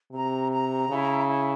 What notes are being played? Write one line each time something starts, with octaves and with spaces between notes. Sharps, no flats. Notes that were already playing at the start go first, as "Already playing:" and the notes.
C3 A#5
A#5
C#3 E4
E4